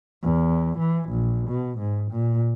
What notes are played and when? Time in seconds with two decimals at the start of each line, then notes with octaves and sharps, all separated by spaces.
0.23 E2
0.78 E3
1.09 A#1
1.49 B2
1.79 G#2
2.11 A#2